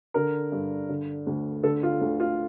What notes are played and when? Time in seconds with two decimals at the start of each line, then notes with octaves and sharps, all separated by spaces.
0.14 D3 A#4
0.52 G2
0.89 D3
1.27 D2
1.63 D3 A4
1.83 F4
2.01 D2
2.20 F4